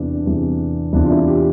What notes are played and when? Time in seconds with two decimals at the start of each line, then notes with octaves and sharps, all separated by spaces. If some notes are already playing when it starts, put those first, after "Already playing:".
Already playing: E2 C3 E3 D4
0.25 E2 C3 E3
0.93 E2 C3 E3 D4
1.04 F4
1.10 E4
1.27 G4